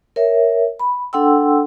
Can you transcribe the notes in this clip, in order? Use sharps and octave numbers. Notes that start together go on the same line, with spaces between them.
A#4 C#5 E5
B5
D4 A4 F#5 G5 C6 E6